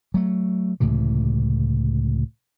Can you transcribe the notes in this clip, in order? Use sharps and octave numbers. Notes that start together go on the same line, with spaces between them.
F#3 A3
C#2 A2 C3 E3